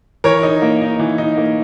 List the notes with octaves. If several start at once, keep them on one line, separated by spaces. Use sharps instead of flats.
E3 A#4 C#5
D#4
A#3
D#4
E3
D#4
A#3